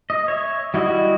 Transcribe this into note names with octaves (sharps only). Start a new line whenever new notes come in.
D#5
C#5 E5
G3 E4 F#4 D#5 D#6